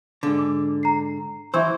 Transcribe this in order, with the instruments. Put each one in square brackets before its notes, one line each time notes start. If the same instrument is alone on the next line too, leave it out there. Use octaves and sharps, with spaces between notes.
[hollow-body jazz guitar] G#2 D3
[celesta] D6
A#5 C7
[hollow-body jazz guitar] D#2 E3 C5 [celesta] E5 C#6 E6